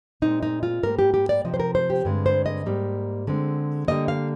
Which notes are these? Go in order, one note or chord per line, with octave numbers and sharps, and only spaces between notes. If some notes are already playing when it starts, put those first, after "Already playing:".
A#2 G#3 C4 D#4
D#4
F4
G#2 G3 A#3 A#4
G4
G4
D5
C3 F3 C4 D#5
C5
A#4
C5
G4
G2 D3 G#3 C4
C5
D#5
G#2 G3 A#3
D3 G#3 C4
D3 G3 A#3 D#5
F5